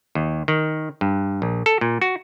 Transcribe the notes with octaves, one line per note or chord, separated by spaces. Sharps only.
D#2
D#3
G2
A#1
A4
A#2
F#4